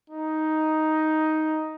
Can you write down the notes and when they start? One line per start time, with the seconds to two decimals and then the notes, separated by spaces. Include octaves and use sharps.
0.10 D#4